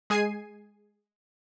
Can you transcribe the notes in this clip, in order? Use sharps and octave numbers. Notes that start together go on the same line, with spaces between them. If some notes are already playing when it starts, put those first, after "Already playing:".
G#3 G#4 G#5 G#6 C7 D#7